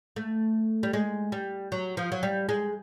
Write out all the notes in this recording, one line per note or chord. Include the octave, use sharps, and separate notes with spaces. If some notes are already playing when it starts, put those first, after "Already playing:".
A3
G3
G#3
G3
F#3
F3
F#3
G3
G#3